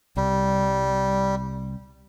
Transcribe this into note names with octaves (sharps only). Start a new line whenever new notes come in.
C2 G3